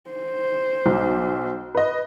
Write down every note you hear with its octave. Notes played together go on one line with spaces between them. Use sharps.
C5
B1
B4 D#5